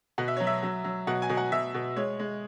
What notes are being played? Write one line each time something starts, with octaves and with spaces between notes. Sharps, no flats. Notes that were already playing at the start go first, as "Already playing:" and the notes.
B2 F#5
E5
F#3 C#5
E5
F#3
F#3
B2 F#5
G#5
B2
F#5
B2 E5
B2
G#3 C#5
G#3